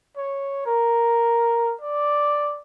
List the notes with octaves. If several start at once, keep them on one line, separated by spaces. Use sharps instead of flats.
C#5
A#4
D5